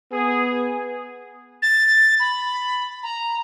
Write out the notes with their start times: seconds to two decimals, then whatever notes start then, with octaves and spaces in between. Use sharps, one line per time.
0.12 B3 G#4
1.62 A6
2.20 B5
3.03 A#5